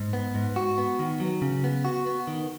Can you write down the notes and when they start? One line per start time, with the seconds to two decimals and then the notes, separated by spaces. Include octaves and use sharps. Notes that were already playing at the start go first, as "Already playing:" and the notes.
Already playing: G#2
0.13 B3
0.35 G#2
0.56 F#4
0.78 B3
0.99 D#3
1.20 F#3
1.42 C#3
1.64 B3
1.85 F#4
2.06 B3
2.28 D#3